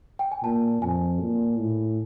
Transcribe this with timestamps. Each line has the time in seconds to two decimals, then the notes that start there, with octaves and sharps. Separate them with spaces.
0.19 G5
0.32 G#5
0.43 A#2 A5
0.82 F2 G#5
1.20 A#2
1.59 A2